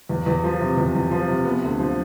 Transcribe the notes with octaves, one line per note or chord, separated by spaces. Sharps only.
E2
E2
F3
C3
E2
E2
F3
C3
B3
D2
F3